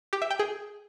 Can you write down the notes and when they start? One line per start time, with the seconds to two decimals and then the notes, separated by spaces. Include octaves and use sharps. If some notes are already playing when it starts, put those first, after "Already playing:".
0.13 G4
0.22 E5
0.31 G5
0.39 G#4